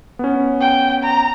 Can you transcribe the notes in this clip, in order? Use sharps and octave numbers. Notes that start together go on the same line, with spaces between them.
B3 C#4
G5
A#5